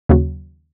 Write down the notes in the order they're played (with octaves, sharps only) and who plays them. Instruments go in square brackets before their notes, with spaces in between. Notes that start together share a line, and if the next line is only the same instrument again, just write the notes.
[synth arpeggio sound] D#2 C#3 F#3